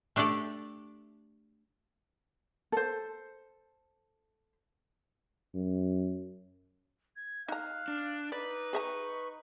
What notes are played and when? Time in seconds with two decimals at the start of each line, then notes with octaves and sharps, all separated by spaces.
0.16 A3 D4 G4 A4 D5
2.72 A4 C5
5.55 F#2
7.16 G#6
7.48 D#4 F5 A#5 F#6
7.88 D4
8.32 D#4 B4 D5 D6
8.73 G#4 E5 A#5 C#6